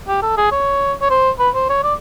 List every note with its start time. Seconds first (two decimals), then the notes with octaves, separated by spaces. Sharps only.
0.08 G4
0.23 A4
0.37 G#4
0.52 C#5
1.02 C#5
1.10 C5
1.39 B4
1.55 C5
1.69 C#5
1.84 D5